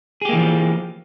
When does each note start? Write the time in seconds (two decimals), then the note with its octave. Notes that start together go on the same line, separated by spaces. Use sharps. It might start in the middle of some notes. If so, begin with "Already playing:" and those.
0.21 G#4
0.25 G4
0.29 A#3
0.33 E3
0.36 F3